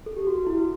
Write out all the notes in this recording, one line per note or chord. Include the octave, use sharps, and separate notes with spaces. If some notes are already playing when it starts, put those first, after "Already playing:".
A4
G4
F#4
F#4
E4
F#4